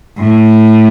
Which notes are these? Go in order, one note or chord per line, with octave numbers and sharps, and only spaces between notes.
A2